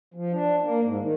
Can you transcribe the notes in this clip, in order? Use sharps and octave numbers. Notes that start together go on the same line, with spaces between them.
F3
D4
A#3
G#2
D#3